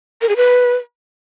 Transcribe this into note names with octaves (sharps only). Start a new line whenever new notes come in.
A#4
G#4
B4